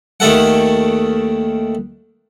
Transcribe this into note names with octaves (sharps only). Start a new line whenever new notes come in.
D#2 D#3 A3 A4 F#5